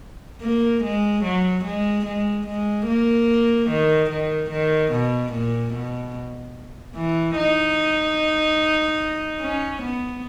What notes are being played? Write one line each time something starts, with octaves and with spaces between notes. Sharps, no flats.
A#3
G#3
F#3
G#3
G#3
G#3
A#3
D#3
D#3
D#3
B2
A#2
B2
E3
D#4
C#4
B3